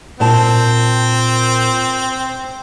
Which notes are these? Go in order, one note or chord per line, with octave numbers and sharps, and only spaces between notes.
A#2 C4 A5